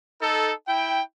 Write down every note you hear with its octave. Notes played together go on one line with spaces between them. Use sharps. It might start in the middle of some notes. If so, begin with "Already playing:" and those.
D#4 A4
E4 G5